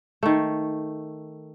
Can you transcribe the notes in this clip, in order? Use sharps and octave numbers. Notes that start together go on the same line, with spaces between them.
D#3 A3